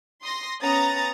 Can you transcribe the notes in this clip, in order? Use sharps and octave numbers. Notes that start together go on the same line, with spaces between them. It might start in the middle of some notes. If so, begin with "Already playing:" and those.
C6 D#6 A#6
B3 C#4 A#5 D#6 A6